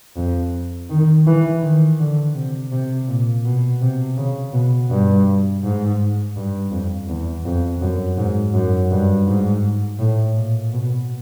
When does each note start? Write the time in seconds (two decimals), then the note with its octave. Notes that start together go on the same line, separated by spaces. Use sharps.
0.17 F2
0.90 D#3
1.27 E3
1.62 D#3
1.99 D3
2.35 C3
2.72 C3
3.08 A#2
3.45 B2
3.81 C3
4.17 C#3
4.53 B2
4.90 G2
5.63 G#2
6.36 G2
6.72 F2
7.09 E2
7.45 F2
7.81 F#2
8.18 G#2
8.54 F#2
8.91 G2
9.27 G#2
9.99 A2
10.36 A#2
10.73 B2